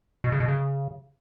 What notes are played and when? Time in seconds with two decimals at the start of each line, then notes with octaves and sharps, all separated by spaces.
0.24 B2
0.32 C#3
0.40 B2
0.48 C#3